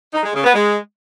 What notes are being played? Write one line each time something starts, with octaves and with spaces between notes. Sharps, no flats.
D#4
G#3
C#3
B3
G#3